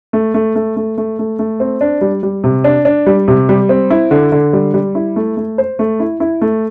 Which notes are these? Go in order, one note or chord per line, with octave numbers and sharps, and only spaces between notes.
A3
A3
A3
A3
A3
A3
A3
C4
D4
G3
G3
C3
D4
D4
G3
C3
G3
C4
E4
D3
D3
G3
G3
E4
A3
A3
C5
A3
E4
E4
A3